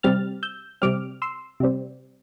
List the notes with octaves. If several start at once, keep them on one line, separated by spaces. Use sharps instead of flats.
C3 G3 C4 F6 A6
E6 G6
C3 G3 C4 D6 F6
C6 E6
C3 G3 C4